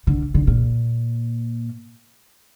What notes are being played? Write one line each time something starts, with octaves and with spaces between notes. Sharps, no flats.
D3
D3
A#2